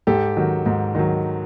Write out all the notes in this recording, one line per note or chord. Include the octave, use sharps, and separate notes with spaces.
G#2 G4 A4
D#3 F#3
G#2
D#3 F#3